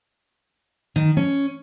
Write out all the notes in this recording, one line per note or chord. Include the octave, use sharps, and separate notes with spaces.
D#3
C#4